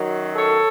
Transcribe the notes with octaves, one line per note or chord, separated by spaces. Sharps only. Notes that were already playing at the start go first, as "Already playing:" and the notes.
Already playing: F#2 D#3 F#3
A4 C#5